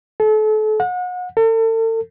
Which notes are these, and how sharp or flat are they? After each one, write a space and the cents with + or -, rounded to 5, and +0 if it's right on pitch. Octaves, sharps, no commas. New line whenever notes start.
A4 -35
F#5 -35
A4 +40